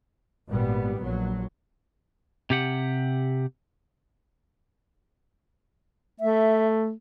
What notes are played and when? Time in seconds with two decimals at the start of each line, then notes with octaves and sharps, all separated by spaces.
0.48 G#1 A#2 G3 B3
1.03 A#1 F#3
2.50 C3 G4 F#5
6.20 A3 E5